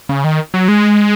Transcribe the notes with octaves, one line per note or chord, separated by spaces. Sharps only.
C#3
D#3
F#3
G#3